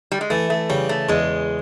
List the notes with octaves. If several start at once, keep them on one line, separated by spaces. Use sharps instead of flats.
G3
G#3
E3 A3
A3
C#3 G3
A3
E2 G#3